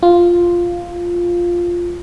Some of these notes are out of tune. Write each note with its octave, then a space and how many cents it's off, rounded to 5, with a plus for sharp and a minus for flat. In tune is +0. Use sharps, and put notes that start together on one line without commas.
F4 +0